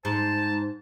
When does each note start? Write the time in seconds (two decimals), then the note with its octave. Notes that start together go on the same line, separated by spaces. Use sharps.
0.05 G#2 C5 A5